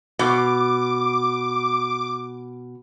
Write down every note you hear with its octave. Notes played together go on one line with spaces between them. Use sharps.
B2 D6